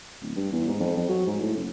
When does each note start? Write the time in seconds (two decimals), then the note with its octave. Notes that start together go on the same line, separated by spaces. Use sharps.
0.22 D1
0.36 G2
0.52 E2
0.68 G#2
0.80 F2
0.96 F2
1.09 F#3
1.27 G#2
1.40 A2
1.55 F#1